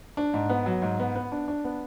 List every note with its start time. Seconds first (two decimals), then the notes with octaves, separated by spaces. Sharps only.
0.17 D4
0.34 G#2
0.50 B3
0.66 F#3
0.82 G#2
1.00 B3
1.15 B3
1.32 D4
1.48 D4
1.64 B3